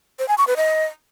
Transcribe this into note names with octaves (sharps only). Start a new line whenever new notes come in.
C5
G#5
C#6
B4
D#5